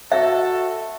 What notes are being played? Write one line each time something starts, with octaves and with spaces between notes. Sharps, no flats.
F#4 A4 E5